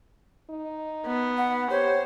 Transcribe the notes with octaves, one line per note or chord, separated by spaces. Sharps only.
D#4
B3
F#5
G4 C5 C#5